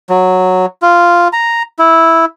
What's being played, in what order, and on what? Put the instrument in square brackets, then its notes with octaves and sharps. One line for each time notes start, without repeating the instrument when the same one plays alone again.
[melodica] F#3
F4
A#5
E4